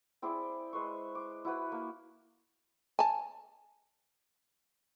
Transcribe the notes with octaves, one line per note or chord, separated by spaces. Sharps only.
C4 E4 G#4 D5
G#3 B4 C5 C#6
D6
E4 F#4 B4
A#3
G#5 A5